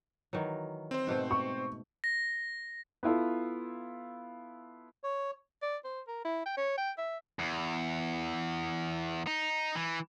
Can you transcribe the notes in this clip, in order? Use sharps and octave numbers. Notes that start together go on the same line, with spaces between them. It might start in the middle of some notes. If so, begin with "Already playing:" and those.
D#3 E3 F#3
C4 C5
G#2 B2 A3
C#6
A#6
B3 E4 F4 A4
C#5
D5
C5
A#4
E4
G5
C#5
G5
E5
E2
D#4
E3